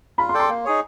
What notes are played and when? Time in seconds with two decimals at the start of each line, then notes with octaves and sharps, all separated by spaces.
0.18 F4 B5
0.29 C6
0.34 A4 D5 G5
0.40 C6
0.49 A#3
0.65 D#4 G#4 C#5